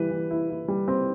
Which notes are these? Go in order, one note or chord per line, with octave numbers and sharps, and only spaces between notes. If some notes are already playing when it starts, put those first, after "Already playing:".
Already playing: E3 G3 B4
E3
E4
E4
G3
C4